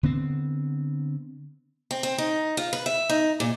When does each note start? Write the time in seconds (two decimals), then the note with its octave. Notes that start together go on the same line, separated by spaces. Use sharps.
0.03 D3 B3 C4
1.91 C4
2.03 C4
2.18 D#4
2.57 F4
2.73 B4
2.86 E5
3.09 D#4
3.40 A#2